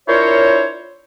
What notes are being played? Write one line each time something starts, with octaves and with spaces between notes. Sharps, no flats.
D4 E4 F4 A#4 C5 C#5